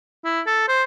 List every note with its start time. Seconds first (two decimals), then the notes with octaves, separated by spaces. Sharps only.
0.25 E4
0.47 A4
0.69 C5